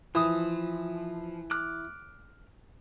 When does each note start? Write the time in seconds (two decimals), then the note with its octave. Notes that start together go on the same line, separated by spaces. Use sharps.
0.15 E3 F3 D#6
1.51 D6 F6 F#6